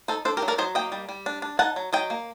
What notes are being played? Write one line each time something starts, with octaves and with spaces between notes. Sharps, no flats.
D#4 A4 C5
D4 A4 C5
G4 A#4
F#3
A#4 D5
F#3 C5 D#5
A#3 D#5 G5
G3
G3
D4
D4
D#4 F#5 A5
F#3
F#3 D#5 G5
A#3